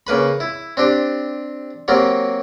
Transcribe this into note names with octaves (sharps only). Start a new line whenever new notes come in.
C#3 A#3 B4 B5
E4
C4 D4 G4
F#3 A#3 C4 G4